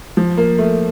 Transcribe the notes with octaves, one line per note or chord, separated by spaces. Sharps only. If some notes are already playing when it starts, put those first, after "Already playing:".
F3
A#3
A3